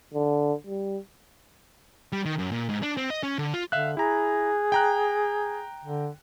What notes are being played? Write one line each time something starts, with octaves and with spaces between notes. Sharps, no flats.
D3
G3
G3
D#3
F#2
A#2
G#2
D4
C4
D#5
C#4
D3
F4
D3 E5 F5 F#6
E4 G#4 A#5
G5 A#5 F#6
D3